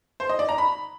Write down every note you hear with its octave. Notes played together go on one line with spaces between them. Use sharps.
C5
D#5
D5
A#5
B5